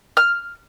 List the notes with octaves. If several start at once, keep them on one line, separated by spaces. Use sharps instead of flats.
F6